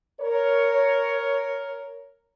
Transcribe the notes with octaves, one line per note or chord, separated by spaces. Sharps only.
A#4 C#5